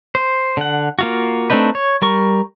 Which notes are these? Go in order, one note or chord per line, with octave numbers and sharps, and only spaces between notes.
C5
D3 F#5
A#3 F4 F#4
A3 C4 D4 D#4 B4
C#5
G3 A#4 C#6